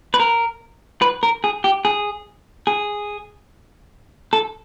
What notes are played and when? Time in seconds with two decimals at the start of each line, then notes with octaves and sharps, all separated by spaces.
0.14 B4
0.20 A#4
1.02 B4
1.23 A#4
1.44 G#4
1.64 G4
1.85 G#4
2.67 G#4
4.33 A4